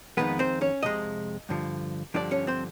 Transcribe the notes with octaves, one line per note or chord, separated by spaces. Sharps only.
F2 C3 D#3 G#3 B3 B4
C4 C5
C#4 C#5
F2 C3 G#3 D#5
G2 D3 F3
G2 D3 F3 D4 D5
C#4 C#5
C4 C5